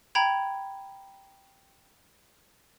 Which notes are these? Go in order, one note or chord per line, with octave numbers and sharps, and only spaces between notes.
G5 A#5 B5 G#6